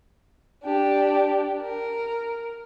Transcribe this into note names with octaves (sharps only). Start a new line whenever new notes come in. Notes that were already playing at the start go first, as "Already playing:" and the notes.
D4 G4
A#4